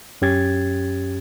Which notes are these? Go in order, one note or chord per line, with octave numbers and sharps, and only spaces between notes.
F#2 C#4 G4 G#6 A6